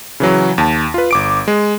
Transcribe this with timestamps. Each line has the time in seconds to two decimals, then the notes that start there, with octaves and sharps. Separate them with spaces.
0.20 C#3 E3 F#3
0.58 D#2 A5
0.94 F4 B4
1.11 G1 D6 D7
1.48 G#3